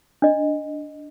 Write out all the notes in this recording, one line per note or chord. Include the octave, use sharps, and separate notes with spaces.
D4 D#5